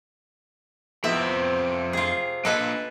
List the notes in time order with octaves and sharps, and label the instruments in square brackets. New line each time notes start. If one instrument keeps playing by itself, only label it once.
[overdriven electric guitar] F2 B5 [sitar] C3 C4 [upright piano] F3 B3 E4 [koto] E5
[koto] F4 G#4
[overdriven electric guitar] A#3 D4 [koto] A4 B4 G#5 [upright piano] D#5